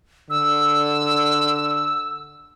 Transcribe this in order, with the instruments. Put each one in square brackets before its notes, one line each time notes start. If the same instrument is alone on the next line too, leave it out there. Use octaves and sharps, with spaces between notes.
[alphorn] D3 [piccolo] E6